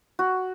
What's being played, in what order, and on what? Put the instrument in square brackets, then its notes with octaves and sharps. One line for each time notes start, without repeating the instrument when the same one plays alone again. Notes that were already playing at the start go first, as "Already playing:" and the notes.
[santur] F#4